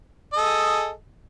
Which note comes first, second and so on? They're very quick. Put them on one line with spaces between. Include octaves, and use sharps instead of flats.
D#5 A4 G#4